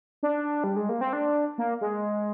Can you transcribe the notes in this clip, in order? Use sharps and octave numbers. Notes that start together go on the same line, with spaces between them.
D4
G3
G#3
A#3
C4
D4
A#3
G#3